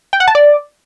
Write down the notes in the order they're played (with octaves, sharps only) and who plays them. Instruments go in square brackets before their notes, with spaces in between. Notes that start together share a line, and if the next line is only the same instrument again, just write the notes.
[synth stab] G5
F#5
A5
D5